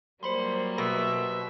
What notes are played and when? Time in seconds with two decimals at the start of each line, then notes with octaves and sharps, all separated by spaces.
0.23 F#3 G3 A#3 C5 B5 C6
0.78 B2 E5